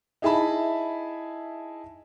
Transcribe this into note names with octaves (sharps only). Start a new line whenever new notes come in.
D#4 E4 G#4 E5 A5 B5